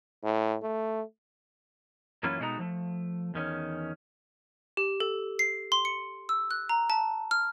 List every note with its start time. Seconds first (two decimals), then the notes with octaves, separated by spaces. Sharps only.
0.24 A2
0.62 A3
2.23 F#2 E3 A#3 C#4 E4 F4
2.40 B2 G#3 A3 D#4 F#4 A#5
2.59 F3 A3
3.34 E2 D#3 C#4
4.77 G4
5.00 A4
5.39 C7
5.72 C6
5.85 C#7
6.29 E6
6.51 F#6
6.69 A#5
6.90 A5
7.31 F6